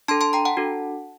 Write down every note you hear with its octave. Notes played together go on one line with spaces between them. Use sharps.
D4 A4 A5 C6
A5 C6
G5 A#5
F#5 A5
D4 F#4 A4